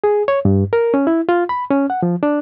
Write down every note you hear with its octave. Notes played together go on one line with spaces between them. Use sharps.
G#4
C#5
G2
A#4
C#4
E4
F4
B5
C#4
F#5
F3
D4